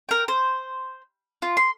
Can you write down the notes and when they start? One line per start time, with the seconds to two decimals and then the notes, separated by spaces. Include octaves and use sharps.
0.09 A#4 G5
0.28 C5
1.42 F4
1.57 C6